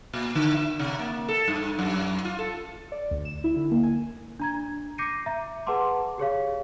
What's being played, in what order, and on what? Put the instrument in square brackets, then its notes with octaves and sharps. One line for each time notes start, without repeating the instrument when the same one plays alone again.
[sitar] A#2
D3
E5
C3
A#3
A4
G2
F#2
F4
A4
[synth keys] D5
D2
E7
E4
D3
A#3
G#5
[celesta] D4 A#5 G#6
D6 G6 A#6 C7 C#7 D#7
E5 A#5
G#4 B4 F#5 A5 C6 D6
G4 G#4 C#5 F5